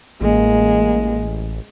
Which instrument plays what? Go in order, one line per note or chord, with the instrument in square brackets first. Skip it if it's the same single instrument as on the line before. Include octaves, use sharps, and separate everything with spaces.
[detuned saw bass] A1 [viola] G#3 [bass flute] A#3